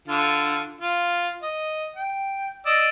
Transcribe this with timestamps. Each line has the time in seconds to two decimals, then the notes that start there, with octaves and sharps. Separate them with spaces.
0.08 D3 F4
0.81 F4
1.43 D#5
1.96 G5
2.66 D5 D#5 E6